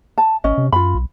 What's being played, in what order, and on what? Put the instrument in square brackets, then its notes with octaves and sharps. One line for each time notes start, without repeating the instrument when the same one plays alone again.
[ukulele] A5
[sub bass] G#1 [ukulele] C#4 D#5
[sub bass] C3
[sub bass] F#2 [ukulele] F4 B5
[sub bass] B1